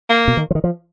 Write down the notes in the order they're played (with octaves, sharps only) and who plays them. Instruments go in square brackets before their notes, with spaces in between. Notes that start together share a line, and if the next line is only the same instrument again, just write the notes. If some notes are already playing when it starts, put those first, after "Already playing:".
[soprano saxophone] A#3
[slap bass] B2
D#3
F3
D#3
F3